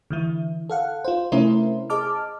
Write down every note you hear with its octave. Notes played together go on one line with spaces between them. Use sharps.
D3 E3 E4
A4 F5 F#5
F4 C5
C3 A3 C#4 E4 A#4 C5
G#4 D#5 A5 D6 F6